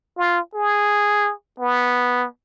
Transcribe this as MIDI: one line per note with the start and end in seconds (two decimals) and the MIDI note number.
0.18 0.40 65
0.54 1.32 68
1.60 2.26 59